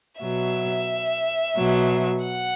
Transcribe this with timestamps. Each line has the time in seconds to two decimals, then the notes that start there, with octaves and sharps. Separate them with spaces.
0.21 B2 F#3 E5
1.56 B2 F#3
2.24 F#5